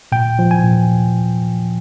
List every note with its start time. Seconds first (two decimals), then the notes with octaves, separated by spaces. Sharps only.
0.12 A#2 G5
0.39 F3
0.51 G#5
0.64 A#2